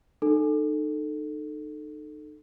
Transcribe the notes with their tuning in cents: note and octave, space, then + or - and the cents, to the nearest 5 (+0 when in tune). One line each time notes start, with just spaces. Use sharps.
D#4 -35 A4 +0